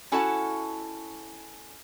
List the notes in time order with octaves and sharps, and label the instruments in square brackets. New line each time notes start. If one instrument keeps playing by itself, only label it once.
[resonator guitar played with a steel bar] C#4 E4 F#4 A4 F#5 A5